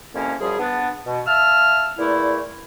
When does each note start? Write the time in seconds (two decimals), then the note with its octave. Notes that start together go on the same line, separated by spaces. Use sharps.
0.14 C2 F2 A#3 C#4
0.41 F#2 F3 G3 G#4
0.59 B3 D4
1.06 B2
1.27 E5 F5 A5 E6 F6
1.98 E2 A#2 A3 E4